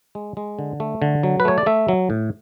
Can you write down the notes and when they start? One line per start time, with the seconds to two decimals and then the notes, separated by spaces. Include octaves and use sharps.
0.15 G#3
0.37 G#3
0.59 D3
0.80 A3
1.02 D3
1.23 F#3
1.40 B4
1.45 A3 C#5
1.58 D5
1.66 A3 E5
1.88 F#3
2.10 A2